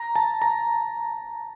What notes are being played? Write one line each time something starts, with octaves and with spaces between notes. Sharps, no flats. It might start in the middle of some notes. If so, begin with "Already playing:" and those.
Already playing: A#5
A5
A#5